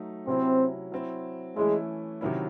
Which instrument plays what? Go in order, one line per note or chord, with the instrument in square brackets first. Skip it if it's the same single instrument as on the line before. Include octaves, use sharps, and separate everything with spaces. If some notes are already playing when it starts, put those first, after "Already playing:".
Already playing: [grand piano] F#3 A3 D#4
[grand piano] C3 F#3 C#4 E4 [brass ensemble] C4
[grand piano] F#3 C4 E4
[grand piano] E3 A3 C#4 E4 [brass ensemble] G#3
[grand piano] C3 D#3 F#3 C#4 E4